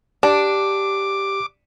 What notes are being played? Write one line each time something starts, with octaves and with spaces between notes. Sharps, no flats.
D4 G4 D6